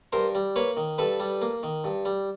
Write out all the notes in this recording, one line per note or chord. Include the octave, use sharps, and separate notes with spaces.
G2 A#4 C5
G3
A#3 B4 C#5
D#3
G2 A4 B4
G3
A#3
D#3
G2
G3